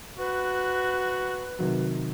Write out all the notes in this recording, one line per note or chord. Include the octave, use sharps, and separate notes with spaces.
F#4 B4
C3 D#3 F#3